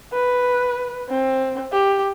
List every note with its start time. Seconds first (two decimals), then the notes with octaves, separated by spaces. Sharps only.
0.12 B4
1.09 C4
1.73 G4